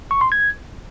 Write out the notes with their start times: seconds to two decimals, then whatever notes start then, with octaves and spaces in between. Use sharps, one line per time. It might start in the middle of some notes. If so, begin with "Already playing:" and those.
0.11 C#6
0.21 C6
0.32 G#6